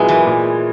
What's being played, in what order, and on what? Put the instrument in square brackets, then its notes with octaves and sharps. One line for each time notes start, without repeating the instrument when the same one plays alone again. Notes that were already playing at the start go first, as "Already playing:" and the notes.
Already playing: [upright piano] A#2 F#3 B3 E4 G#4 [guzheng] G#3
[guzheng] E3
[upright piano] A#2